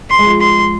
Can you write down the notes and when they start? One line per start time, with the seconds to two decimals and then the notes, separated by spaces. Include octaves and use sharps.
0.10 C6
0.19 G#3
0.26 F3
0.41 C6